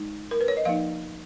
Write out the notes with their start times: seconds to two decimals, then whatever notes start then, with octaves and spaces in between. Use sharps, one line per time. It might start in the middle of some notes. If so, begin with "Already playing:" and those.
Already playing: G#3 D#4
0.31 A#4
0.41 B4
0.48 C#5
0.57 D#5
0.65 F3 A#3 D#4 F5